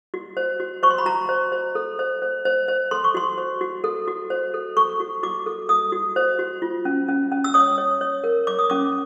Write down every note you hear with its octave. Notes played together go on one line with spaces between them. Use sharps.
F#4
C5
F#4
C5 C#6
C6
B5
F#4 A#5
C5
C5
A4
C5
C5
C5
C5
A4 C6
C#6
F#4 C6
C5
F#4
A4
F#4
C5
A4
A4 C#6
F#4
F#4 D6
A4
A4 D#6
F#4
C5
F#4
F4
C#4
C#4
C#4
E6
C#5 D#6
C#5
C#5
A#4
C#5 D6
D#6
C#4 D6